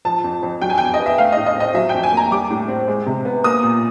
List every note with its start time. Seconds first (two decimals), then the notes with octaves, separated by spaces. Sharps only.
0.05 F3 A5
0.24 F2
0.43 F2
0.61 F#3 G5
0.70 G#5
0.78 E2 G5
0.94 D#5
0.99 B3
1.06 E5
1.18 A3 F5
1.32 A2 D#5
1.46 D#5
1.56 C4 D#5
1.74 F#3 E5
1.89 F2 G5
2.03 G#5
2.12 A#3
2.17 A#5
2.31 G3 D6
2.50 A2
2.68 C4
2.88 G#3
3.06 C3
3.25 B3
3.44 A#3 D#6
3.63 A#2